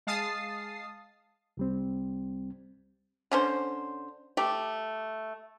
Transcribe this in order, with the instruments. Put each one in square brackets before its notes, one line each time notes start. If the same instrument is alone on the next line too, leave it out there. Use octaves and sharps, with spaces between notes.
[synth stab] G#3 F5 A5 D#6 A6 C7
[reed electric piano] C2 G3 C4
[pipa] D3 C#4 C5
A3 G4